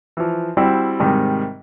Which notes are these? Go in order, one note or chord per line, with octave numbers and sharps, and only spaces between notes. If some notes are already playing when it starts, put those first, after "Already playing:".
E3 F3
G3 C4 E4 F#4
G#2 C3 D#3 G3